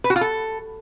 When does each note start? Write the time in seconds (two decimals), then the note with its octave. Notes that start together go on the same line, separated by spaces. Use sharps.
0.04 B4
0.10 F#4
0.16 F4
0.21 A4